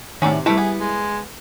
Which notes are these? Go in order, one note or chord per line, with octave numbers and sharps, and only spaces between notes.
A2 C3 D#3 C#4 F#4 D5
G3 A3 E4 B4
B3 G#4
G#3